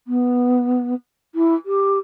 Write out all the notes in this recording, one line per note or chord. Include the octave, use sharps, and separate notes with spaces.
B3
E4
G4